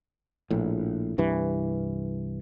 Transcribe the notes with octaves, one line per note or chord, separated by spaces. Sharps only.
A#1 A2
C2 G2 E3